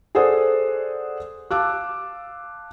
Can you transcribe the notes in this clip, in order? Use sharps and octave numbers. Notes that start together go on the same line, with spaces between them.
G#4 A4 C5 D5 F#5 D#6
F5 A5 D6 E6 F#6